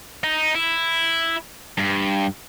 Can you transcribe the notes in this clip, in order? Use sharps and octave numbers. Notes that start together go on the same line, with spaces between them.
D#4
E4
G2